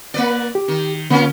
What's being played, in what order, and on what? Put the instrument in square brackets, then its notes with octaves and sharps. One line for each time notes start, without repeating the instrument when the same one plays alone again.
[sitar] A#3 B4 D5
[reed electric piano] G4
[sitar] D#3
[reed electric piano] D3 [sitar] A#3 C#4 F4